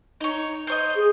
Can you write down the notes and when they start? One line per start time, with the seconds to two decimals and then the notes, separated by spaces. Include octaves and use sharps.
0.21 D#4 C#5
0.67 C5 C#5 D#5
0.95 G#4